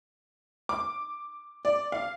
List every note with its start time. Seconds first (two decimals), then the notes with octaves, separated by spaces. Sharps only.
0.69 D6
1.65 D5
1.92 F5